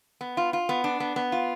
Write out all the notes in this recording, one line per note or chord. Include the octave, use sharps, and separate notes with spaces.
B3
F4
F4
B3
D4
B3
B3
F4